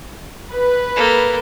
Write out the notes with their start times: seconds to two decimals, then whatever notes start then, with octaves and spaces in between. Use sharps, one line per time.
0.53 B4
0.95 A#3 A4